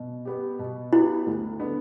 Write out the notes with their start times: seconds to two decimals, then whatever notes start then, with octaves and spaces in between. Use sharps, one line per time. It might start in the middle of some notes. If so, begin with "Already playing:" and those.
Already playing: B2
0.25 B3 G4
0.59 B2
0.93 B3 E4 G4
1.26 D2
1.60 D3 B3